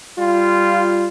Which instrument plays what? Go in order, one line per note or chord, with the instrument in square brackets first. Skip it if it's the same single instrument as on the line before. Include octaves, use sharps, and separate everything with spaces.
[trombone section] G3 F4